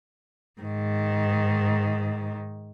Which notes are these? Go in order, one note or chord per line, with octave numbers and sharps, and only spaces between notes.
G#2 D#3